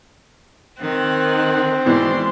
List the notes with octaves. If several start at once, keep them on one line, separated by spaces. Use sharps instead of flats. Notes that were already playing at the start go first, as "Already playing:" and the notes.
D#3 C4 F#6
G#2 B2 E3 D5 C6